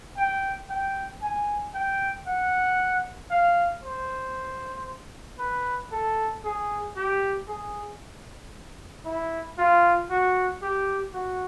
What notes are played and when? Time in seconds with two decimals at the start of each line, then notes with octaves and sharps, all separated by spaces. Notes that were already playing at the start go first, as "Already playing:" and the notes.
0.18 G5
0.70 G5
1.22 G#5
1.75 G5
2.27 F#5
3.31 F5
3.84 C5
5.39 B4
5.92 A4
6.45 G#4
6.96 G4
7.48 G#4
9.05 E4
9.58 F4
10.10 F#4
10.62 G4
11.14 F#4